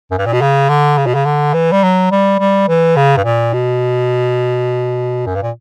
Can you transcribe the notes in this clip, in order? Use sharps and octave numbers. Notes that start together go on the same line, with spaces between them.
F#2
G2
A#2
B2
C#3
D3
C#3
B2
C#3
D3
E3
G3
F#3
G3
G3
E3
C#3
G2
A#2
B2
F#2
G2
A#2